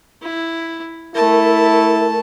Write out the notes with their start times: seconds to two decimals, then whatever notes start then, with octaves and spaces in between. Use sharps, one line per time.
0.22 E4
1.15 A3 E4 A#4 A5